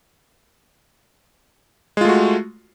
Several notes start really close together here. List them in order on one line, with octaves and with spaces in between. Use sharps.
G#3 F4 A3 F#4